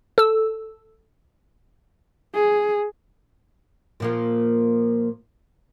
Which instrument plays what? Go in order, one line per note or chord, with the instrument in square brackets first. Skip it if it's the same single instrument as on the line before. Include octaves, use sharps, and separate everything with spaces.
[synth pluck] A4 E6
[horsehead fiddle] G#4
[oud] A#2 F3 A#3